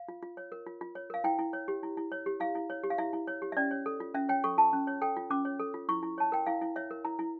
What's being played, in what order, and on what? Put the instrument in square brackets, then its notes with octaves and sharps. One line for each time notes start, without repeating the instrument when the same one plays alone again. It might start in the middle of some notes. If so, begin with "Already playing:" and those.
Already playing: [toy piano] F5
F4
F4
C#5
A#4
F4
F4
C#5
A#4 F5
E4 G5
E4
C#5
G4
E4
E4
C#5
G4
E4 F5
E4
C#5
G4
F5
E4 E5
E4
C#5
G4
E5
C#4 D5
C#5
A4
F4
C#4 E5
C#5 G5
A4 C#6
F4 A5
C#4
C#5
A4 G5
F4
C#4 D6
C#5
A4
F4
E4 C#6
E4
C#5 A5
A#4 G5
E4 F5
E4
C#5 E5
A#4
E4 A#5
E4